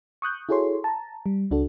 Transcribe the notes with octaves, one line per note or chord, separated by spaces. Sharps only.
C#6 D#6 F#6 G6
E4 F#4 G#4 A4 C#5 C6
A5 A#5
G3
C#2 D4 F#4 A4